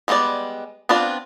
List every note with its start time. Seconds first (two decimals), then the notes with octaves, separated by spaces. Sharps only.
0.08 G3 G#3 B3 F4 D5
0.89 B3 C4 D4 F4 D5